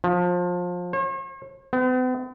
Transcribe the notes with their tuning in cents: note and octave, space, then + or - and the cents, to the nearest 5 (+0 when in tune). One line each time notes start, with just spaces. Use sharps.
F3 +25
C#5 -45
B3 +45